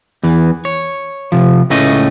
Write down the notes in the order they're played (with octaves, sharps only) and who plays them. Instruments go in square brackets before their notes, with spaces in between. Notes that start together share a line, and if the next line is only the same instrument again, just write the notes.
[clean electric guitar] E2 E3
C#5
C3 F3
C#2 A2 A3 C#4 D#5